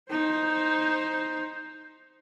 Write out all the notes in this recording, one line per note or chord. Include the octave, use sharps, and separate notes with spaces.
D#4 C5